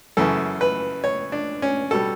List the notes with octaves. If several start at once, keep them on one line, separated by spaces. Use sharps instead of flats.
F#2 C#3 E3 A4
B4
C#5
D4
C#4
B2 G3 A4